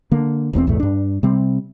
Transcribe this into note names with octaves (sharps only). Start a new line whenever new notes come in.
D3 A#3
E1 E2 G3 C4
B1 E2 A2 A3
G2 D4
C3 G3 C4